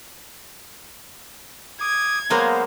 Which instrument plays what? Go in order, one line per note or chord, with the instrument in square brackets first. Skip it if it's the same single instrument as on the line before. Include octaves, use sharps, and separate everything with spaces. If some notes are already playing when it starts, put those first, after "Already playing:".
[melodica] D6 D#6 [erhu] G#6
[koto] F#3 G#3 A#3 [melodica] B3 C5 F5